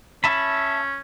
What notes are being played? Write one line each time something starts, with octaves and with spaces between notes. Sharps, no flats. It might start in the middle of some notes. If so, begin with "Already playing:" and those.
C#4 E5 A5 B5